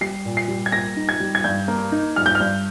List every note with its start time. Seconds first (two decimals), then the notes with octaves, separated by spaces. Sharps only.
0.01 G3 C7
0.25 A#2
0.37 C7
0.48 G3
0.66 G#6
0.72 A#3 A#6
0.97 D#4
1.09 G#6
1.20 G3
1.35 G#6
1.44 G2 G6
1.68 A#3
1.92 D#4
2.16 G2 F6
2.26 G6
2.35 F6
2.40 G2